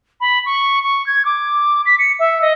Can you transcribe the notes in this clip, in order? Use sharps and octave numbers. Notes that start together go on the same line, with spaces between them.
B5
C#6
C#6
G#6
D6
B6
C#7
E5
D#5